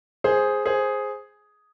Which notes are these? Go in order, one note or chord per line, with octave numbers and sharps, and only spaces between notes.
G#4 C5
G#4 C5